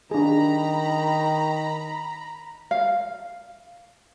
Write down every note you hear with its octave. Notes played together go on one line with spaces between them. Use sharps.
D#3 D4 G#4 A#5 B5
F5